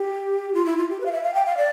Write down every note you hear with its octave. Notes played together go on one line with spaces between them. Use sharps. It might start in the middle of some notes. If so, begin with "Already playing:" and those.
Already playing: G4
F4
E4
F4
G4
B4
F5
E5
F5
G5
F5
D5